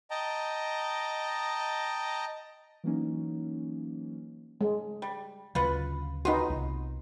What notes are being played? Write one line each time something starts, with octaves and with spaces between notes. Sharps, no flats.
D#5 G5 A5 A#5
E3 F#3 A#3 C#4 D#4
G#3
G3
D2 C#3 F#3 F4 B4 F#5
B3 D#4 F4 F#4
C2